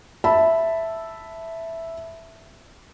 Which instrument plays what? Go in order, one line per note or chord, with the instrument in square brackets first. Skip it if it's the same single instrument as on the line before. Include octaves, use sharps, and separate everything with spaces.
[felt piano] E5 A5 B5